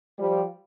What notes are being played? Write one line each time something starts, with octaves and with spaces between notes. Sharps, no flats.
F3 G3